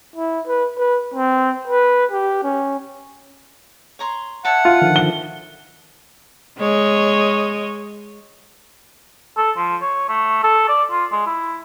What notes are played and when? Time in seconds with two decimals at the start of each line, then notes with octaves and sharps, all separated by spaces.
0.16 E4
0.47 B4
0.77 B4
1.14 C4
1.68 B4
2.11 G4
2.43 C#4
3.99 C#5 A#5 C6
4.45 C#5 E5 F#5 A5
4.65 F4
4.82 D3 D#3 F3
4.96 G7
6.58 G#3 C#5 D#5
9.37 A4
9.57 F3
9.82 C#5
10.09 A3
10.43 A4
10.69 D5
10.91 F4
11.12 G#3
11.26 E4